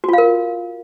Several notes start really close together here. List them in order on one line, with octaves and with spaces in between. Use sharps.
F#4 F4 F5 A#4